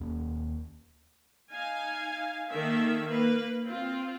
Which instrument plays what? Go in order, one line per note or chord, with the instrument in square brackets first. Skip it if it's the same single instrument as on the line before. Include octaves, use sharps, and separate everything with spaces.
[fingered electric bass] D#2 A#3 C#4
[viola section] D#4 F5 G#5
D#3 A#3 A4 E5
A#3 B4
C4 F4